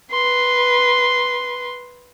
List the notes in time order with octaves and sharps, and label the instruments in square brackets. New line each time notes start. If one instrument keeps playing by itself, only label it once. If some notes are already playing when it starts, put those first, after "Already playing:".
[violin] B4 C6